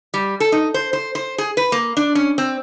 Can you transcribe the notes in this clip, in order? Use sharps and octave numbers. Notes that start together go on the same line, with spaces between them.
G3
A4
D#4
C5
C5
C5
G#4
B4
A#3
D4
C#4
C4